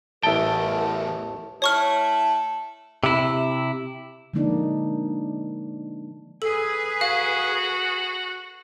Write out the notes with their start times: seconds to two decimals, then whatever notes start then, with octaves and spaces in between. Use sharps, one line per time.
0.23 A1 E2 A3 A#4 E5 G5 A5
1.62 A3 E4 A4 C#5 C#6 F6
3.04 C3 E4
4.34 D3 F3 G#3 A#3 D4 D#4
6.42 G#4 A4 B4
7.01 F#4 F5